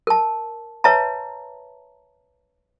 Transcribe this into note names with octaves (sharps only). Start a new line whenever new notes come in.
A#4 A5
B4 C#5 E5 A5 A#5